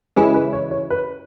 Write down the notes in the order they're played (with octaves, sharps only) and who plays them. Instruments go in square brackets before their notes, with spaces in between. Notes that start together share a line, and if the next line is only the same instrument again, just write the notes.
[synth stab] C#3 E3 G#3 C#4 E4 [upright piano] G#4
[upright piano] B4
C#5
C#5
B4